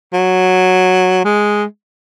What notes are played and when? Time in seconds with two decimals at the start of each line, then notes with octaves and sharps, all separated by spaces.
0.13 F#3
1.25 G#3